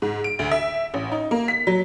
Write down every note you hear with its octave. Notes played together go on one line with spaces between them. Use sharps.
G#2
D7
D2
E5
A1
D#4
A#3
B6
F#3